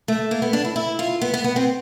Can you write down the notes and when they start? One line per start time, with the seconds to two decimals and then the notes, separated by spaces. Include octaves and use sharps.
0.08 A3
0.31 A#3
0.42 B3
0.53 D4
0.65 E4
0.76 E4
0.99 F4
1.21 B3
1.34 B3
1.44 B3
1.56 C4